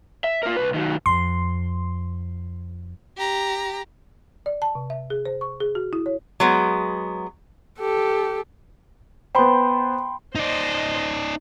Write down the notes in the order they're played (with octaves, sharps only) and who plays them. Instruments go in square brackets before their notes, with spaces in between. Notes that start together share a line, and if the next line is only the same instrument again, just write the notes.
[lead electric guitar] E5
F4 A#4
C2 B4
D#3 F#3
[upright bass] F2 [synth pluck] C6
[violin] G4 A#5
[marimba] D5
A5
C3
E5
G#4
C5
C#6
G#4
F#4
E4
C#5
[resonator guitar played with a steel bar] F#3 G#3 B3
[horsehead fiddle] G4 A4
[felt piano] B3 C5 [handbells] G5 B5 C6
[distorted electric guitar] D#4 D5 [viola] C5 D#5